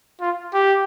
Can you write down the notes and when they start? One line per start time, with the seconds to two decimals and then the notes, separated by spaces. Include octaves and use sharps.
0.20 F4
0.54 G4